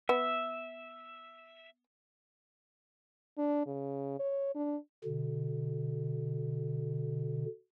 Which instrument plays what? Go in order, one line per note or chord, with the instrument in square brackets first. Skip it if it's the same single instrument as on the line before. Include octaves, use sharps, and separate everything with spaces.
[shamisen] B3 [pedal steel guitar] E5
[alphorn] D4
C#3
C#5
D4
[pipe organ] B2 D3